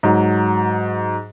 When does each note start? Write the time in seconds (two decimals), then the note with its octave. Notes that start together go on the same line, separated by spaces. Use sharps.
0.03 G#2 F#3